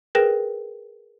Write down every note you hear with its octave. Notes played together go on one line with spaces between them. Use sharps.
G#4 A#4 B4 G5 A#6 E7